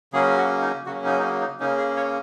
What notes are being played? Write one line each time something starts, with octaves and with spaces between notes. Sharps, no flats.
C#3 F#3 A#3 C#4 G#4
F#4
D#4
C#3 F#3 A#3 C#4 F#4
D#4
D#4
C#4
D#4
C#3 A#3 C#4 D#4
G#4
C#5